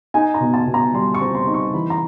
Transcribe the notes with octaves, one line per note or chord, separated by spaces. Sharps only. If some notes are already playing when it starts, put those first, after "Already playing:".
D#4 G#5
A#5
B2
A5
B2
A#5
G3 C6
C#6
C4
C6
D#4
C#6
E3 B5
A#5